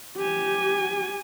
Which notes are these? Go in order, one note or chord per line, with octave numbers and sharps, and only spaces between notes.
G4 G#5